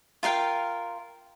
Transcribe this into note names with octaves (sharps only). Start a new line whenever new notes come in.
F4 A#4 F5 G5